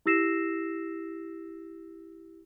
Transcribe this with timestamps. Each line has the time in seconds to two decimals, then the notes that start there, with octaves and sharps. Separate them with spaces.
0.06 E4 G4 E6 A#6 C7 E7